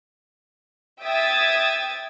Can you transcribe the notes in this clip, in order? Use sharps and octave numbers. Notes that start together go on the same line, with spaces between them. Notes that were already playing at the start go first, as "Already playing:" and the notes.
E5 G5 D#6 G#6 A6